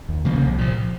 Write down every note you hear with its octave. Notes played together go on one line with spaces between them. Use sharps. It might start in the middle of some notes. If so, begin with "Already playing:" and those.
D#2
C#3 F3 A#3
C2
A#2 F3